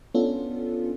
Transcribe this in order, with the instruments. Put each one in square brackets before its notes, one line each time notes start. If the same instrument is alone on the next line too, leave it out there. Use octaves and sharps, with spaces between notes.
[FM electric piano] B3 C#4 D4 F4 A4